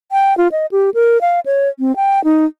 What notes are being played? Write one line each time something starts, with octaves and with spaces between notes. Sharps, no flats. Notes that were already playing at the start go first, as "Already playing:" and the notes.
G5
F4
D#5
G4
A#4
F5
C#5
C4
G5
D#4